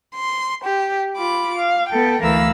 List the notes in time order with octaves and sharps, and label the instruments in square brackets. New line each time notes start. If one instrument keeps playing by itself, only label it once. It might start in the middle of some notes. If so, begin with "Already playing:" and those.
[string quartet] C6
G4
F4 B5 D6
F5
B3 A4 G5
D2 E3 A#4 B4 F5 E6